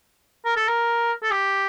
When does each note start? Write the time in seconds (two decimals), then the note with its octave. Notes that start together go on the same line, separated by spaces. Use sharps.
0.45 A#4
0.56 A4
0.68 A#4
1.23 A4
1.31 G4